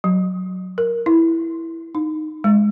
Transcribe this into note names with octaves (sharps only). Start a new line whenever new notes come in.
F#3
A#4
E4
D#4
G#3